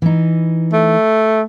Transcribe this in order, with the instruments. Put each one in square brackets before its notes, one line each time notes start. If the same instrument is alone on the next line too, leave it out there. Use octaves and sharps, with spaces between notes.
[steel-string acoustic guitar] E3 D#4
[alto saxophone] A3